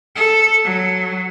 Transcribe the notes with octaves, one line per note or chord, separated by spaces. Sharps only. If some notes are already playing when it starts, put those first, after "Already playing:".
A4
F#3